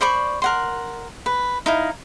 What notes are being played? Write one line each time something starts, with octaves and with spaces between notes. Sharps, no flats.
C5 D5 B5 C#6
A#4 F#5 C6
B4
D#4 E4 F5